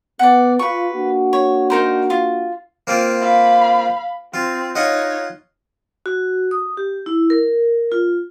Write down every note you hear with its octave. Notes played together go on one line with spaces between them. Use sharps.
B3 D5 F#5
F4 B4 C#6
A#3 D4 F#4
C#5
D#4 A#4 C5
F4
A#3 C4 F4
F5 B5
C4 F4
D#4 F4 C#5 D#5 F#5
F#4
D#6
G4
E4
A#4
F4